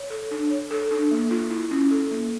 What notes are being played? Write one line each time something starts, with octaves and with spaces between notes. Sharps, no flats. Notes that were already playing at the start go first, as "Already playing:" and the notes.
Already playing: C#5
A4
D4
C#5
A4
D4
A#3
F4
E4
C#4
A4
A#3